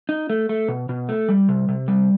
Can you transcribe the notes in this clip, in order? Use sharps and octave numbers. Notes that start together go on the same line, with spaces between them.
D#4
A3
A3
B2
B2
A3
G3
C3
C3
G3